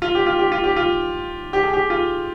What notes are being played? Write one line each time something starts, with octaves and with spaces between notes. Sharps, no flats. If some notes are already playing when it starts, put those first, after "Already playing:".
F4
G4
F4
G4
F4
G4
F4
G4
G#4
G4
F4